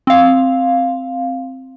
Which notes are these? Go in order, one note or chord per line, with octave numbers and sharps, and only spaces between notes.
C4 F5